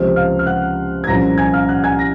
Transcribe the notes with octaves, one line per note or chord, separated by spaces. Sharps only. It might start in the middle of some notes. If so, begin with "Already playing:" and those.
Already playing: C#2 C3 F3 C4 F6
F5 F6
F6
F#5 F#6
G#6
C2 A#2 F3 A#3 C#4 A#5 A#6
G#5 G#6
F5 F6
F#5 F#6
G#5 G#6
A#6